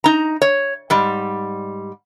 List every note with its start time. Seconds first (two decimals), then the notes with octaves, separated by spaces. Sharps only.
0.04 D#4 A#5
0.42 C#5
0.90 G#2 G3